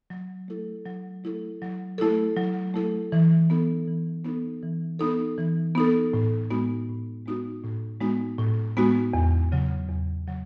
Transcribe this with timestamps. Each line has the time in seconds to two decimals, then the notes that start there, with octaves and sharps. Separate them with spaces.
0.10 F#3
0.48 A3 E4 A4
0.86 F#3
1.24 A3 E4 A4
1.62 F#3
1.98 A3 E4 A4
2.37 F#3
2.74 A3 E4 A4
3.12 E3
3.50 B3 D#4 A4
3.88 E3
4.24 B3 D#4 A4
4.63 E3
4.99 B3 D#4 A4
5.38 E3
5.75 B3 D#4 A4
6.14 A2
6.50 G#3 B3 D#4 F#4
6.89 A2
7.26 G#3 B3 D#4 F#4
7.64 A2
8.01 G#3 B3 D#4 F#4
8.38 A2
8.77 G#3 B3 D#4 F#4
9.13 E2
9.52 C#3 F#3
9.89 E2
10.27 C#3 F#3